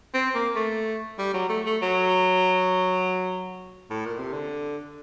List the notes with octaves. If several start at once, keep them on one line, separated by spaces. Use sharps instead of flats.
C4
A#3
A3
G3
F#3
A3
A3
F#3
A2
A#2
C3
D3